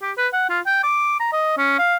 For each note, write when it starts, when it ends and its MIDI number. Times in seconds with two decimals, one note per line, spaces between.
0.02 0.12 67
0.17 0.28 71
0.33 0.46 78
0.49 0.60 65
0.66 0.79 79
0.83 1.17 86
1.20 1.28 82
1.32 1.53 75
1.57 1.78 61
1.79 1.96 77